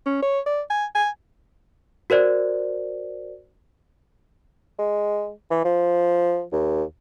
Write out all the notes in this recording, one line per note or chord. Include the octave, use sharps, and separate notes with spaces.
C#4
C#5
D5
G#5
G#5
F#4 A#4 C5 D5
G#3
E3
F3
D#2